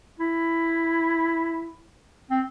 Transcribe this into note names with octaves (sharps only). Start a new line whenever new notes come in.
E4
C4